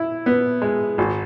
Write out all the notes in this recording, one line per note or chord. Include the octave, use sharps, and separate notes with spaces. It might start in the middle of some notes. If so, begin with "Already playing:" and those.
Already playing: E4
B3
G#3
G#1